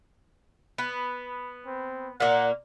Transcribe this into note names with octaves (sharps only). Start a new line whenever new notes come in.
B3
C4
A#2 A#3 F#5